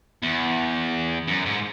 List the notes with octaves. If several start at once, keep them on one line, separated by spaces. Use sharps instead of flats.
E2
F#2
G#2